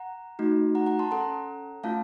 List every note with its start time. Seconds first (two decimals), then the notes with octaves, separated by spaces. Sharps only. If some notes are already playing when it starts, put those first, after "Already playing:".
Already playing: F#5 A#5
0.39 A3 D#4 F#4
0.75 F#5 A#5
0.86 F#5 A#5
0.99 A5 C6
1.11 C#4 A4 F#5 A#5
1.83 A3 C#4 F4 F5 A5